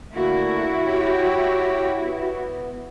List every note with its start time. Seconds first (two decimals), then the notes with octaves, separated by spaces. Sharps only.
0.14 D3 A3 A#3 E4 F#4
0.87 G4 C#5 G5
2.01 B3